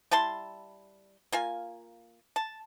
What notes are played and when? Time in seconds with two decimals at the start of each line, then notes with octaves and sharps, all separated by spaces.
0.11 G3 E4 A5 C6
1.32 A#3 F4 G#5
2.36 A5